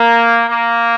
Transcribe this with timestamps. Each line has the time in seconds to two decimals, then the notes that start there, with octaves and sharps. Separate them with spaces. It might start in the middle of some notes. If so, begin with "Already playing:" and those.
Already playing: A#3
0.48 A#3